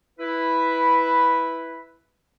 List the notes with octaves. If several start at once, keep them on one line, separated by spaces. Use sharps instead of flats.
E4 B4